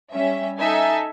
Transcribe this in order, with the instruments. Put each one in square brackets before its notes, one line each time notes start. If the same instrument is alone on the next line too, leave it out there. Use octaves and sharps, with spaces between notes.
[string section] G3 C#4 E5
D#4 A4 E5 G#5